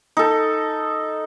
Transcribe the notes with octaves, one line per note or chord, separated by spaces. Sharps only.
D#4 A4